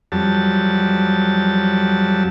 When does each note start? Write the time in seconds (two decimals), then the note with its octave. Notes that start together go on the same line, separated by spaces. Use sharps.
0.12 F2 F#3 G3 A5